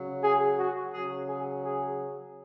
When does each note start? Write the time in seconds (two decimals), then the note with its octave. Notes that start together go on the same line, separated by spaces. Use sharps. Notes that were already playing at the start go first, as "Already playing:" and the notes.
Already playing: C#3 F#3
0.24 G#4
0.58 F#4
0.93 C#3 F#3 G#4
1.28 G#4
1.63 G#4